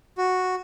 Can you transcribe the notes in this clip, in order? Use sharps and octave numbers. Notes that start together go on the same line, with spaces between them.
F#4